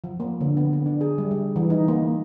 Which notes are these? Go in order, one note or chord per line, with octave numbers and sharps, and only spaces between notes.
F3
A#3
D3
B3
B3
D4
G#4
G3
G3
E3
D#4
A#3